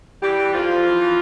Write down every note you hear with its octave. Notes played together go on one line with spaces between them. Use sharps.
E3 G3 G4
E3
F2 F3 F4
F2
E3
E3